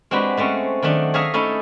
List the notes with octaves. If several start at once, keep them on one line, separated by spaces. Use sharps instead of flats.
G#3 C4 D4 F#4 G4 B4
G#3 A3 C4 C#4
D#3 F#3 A3 D4
G#4 C#5 E5 F5 G#5 A#5
A3 C#4 D#4 E4 A4